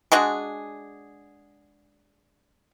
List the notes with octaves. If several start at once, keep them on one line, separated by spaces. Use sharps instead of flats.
G#3 D4 F#4 G#4